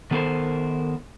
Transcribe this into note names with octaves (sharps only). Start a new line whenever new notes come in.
D#3 B3 A4 A#4 C5